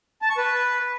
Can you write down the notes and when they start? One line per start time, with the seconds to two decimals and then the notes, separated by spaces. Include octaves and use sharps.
0.22 A5
0.30 C#6
0.38 B4